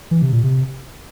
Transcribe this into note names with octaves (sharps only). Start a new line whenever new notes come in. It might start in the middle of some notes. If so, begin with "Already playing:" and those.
E3
C3
A#2
C3